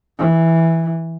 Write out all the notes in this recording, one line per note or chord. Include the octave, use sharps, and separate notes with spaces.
E3